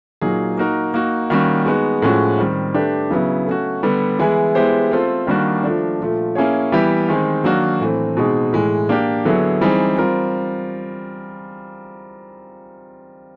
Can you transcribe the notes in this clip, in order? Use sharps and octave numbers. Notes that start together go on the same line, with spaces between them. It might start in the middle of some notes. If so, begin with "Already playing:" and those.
A#2 F#3 A#3 D#4 G#4
A#3 D#4 F#4 A#4
A#3 D#4 F#4
D#3 G3 A#3 C#4 F#4
G#3 B3 D#4 F#4
A2 F3 G#3 C#4 F#4
D#3 G3 C4
A3 D4 G4 B4
C#3 F#3 B3 E4
A3 C#4 F#4
D3 G3 B3
E3 G#3 B3 E4 G#4
G#3 B3 E4 G4 C5
A3 C4 F4 A4 C5
D#3 G3 A#3 D4 F#4
F3 A3 D4
A#2 F3 A3
A#3 C#4 E4 G#4 C#5
E3 G3 B3 E4 G4
D#3 G#3 C4 D#4 G#4
D#3 F#3 A#3 D4 F#4
A2 E3 A3 C4
B2 G#3 C4 D#4 G#4
A2 E3 G#3
A#3 D4 G4
D3 F#3 B3 E4 G#4
E3 G3 C4 D#4 G#4
G3 C4 F4 A#4